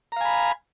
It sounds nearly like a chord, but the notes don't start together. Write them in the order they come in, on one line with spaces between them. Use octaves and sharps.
A#5 F5 G#5 B5